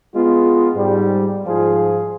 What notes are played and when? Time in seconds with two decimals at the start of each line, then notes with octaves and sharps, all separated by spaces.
0.14 G#3 B3 F4
0.75 G#2 G3
1.46 G#2 F3 F4 G#4